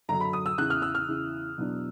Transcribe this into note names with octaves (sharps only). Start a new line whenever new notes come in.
F#2 D3 F#3 A#5
B5
D#6
E6
E2 C#3 E3 F#6
F6
E6
F6
E2 C#3 E3
E2 B2 F#3 B3 D4